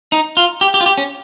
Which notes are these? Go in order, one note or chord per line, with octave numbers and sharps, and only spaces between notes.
D#4
F4
G4
G4
F4
G4
C#4